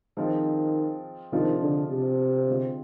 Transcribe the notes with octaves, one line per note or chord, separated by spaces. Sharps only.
D#3 F3 G#3 C4 F4
C3 D#3 F3 G#3 D4 F4
D3
C3
D3 G#3 C4 F4